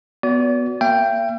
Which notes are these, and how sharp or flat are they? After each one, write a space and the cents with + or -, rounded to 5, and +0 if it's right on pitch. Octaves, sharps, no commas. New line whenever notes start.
B3 +0 F#4 +0 D5 -35
A#3 +0 E5 +45 G5 +0